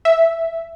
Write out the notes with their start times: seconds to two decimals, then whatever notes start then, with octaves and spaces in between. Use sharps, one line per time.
0.05 E5